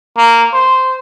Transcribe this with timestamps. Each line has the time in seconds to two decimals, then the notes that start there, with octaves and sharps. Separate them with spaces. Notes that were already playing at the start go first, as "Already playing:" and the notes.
0.17 A#3
0.53 C5